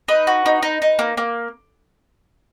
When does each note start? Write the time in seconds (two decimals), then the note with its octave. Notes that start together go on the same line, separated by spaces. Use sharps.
0.08 D#4 B4
0.27 F#4
0.46 D#4
0.63 D#4
0.82 D#4
0.99 A#3
1.17 A#3